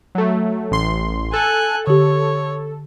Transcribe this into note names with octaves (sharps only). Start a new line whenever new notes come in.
F#3 A3
A1 C6
A4 G#5 F#6
D3 G4 C#5